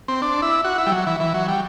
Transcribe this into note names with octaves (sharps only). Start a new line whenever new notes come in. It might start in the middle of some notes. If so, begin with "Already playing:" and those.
C4
D4
E4
F#4
E4
G3
F#3
E3
E3
F#3
G3